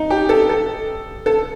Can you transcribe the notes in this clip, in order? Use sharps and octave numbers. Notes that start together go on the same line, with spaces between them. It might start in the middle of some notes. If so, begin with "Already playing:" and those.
Already playing: D#4
G4
A4
A4
A4